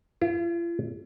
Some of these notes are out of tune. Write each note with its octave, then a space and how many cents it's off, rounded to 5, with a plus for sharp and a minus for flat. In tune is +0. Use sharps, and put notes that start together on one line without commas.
F4 -45